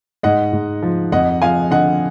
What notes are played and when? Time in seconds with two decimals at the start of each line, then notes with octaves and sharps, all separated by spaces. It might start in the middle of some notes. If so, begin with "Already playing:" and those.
0.23 G#2 D#5 F#5
0.53 G#2
0.82 F3
1.12 F2 D#5 F#5
1.42 F3 F5 G#5
1.71 D3 D#5 F#5